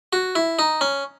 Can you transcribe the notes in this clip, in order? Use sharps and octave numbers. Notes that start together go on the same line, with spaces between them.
F#4
E4
D#4
C#4